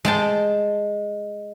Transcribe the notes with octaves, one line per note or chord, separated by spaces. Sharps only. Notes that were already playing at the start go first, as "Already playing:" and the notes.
G#3 G5 A5